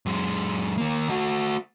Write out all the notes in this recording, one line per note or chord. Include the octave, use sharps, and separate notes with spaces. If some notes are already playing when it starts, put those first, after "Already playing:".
F#2 G#3
D#2 A#3
A3 F#4